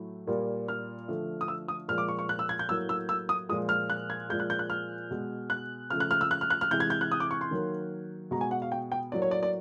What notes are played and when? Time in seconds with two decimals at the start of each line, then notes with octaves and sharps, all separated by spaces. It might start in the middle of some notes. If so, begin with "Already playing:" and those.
Already playing: A2 F#3 A3
0.27 A#2 G3 A#3
0.68 F6
1.08 D3 F3 A3
1.41 D#6
1.48 E6
1.68 D#6
1.88 A#2 F3 G#3 F6
1.98 D6
2.08 C#6
2.19 C#6
2.29 F#6
2.39 E6
2.49 G#6
2.59 G6
2.69 A2 F#3 A#3 E6
2.89 E6
3.09 E6
3.29 D#6
3.49 A#2 F3 G#3 D#6
3.69 F6
3.90 F#6
4.10 G#6
4.29 A#2 F3 G#3 G6
4.40 F#6
4.50 G6
4.59 F#6
4.70 F6
5.11 B2 G#3
5.50 F#6
5.90 C#3 F3 A3 F6
6.00 F#6
6.11 F6
6.21 E6
6.31 F#6
6.41 F6
6.50 F#6
6.61 F6
6.71 C3 E3 G#3 G6
6.80 G#6
6.90 G6
7.01 F#6
7.11 D#6
7.20 D6
7.31 C#6
7.41 C6
7.51 D#3 F#3 A#3
8.31 B2 G#3 A#5
8.41 G#5
8.51 F#5
8.62 F5
8.72 G5
8.92 G5
9.12 A2 F#3 A#3 D5
9.22 C#5
9.31 D5
9.43 D5